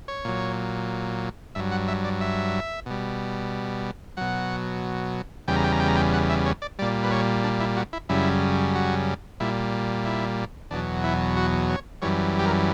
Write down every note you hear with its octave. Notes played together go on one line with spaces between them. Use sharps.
C#5
A#2 F#3
G2 F#3 E5
F#5
E5
D5
E5
B2 G3
B2 F#3 F#5
E2 C#3 G3 G5
A#5
G5
A#5
G5
A#5
G5
F#5
E5
C#5
D5
A#2 G3 D5
B4
C#5
D4
E4
F#4
E4
F#2 C#3 G3 E4
F#4
A#2 G3 E4
E4
E2 B2 F#3 D4
E4
F#4
C#5
F#2 E3 G3 C#5
G4
A#4